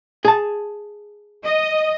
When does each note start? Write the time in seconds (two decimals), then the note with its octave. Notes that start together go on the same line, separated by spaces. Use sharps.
0.25 G#4 A5
1.44 D#5